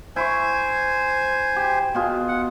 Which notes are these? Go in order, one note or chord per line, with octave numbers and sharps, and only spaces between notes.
E4 C5 G#5 C#6
G4
B2 F4 G#4
F#5